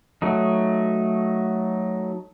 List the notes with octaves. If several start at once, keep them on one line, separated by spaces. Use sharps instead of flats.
F#3 A3 D#4